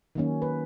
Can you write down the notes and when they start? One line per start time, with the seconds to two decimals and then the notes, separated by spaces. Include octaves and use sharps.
0.15 D#3 F#3 A#3 C#4
0.42 B4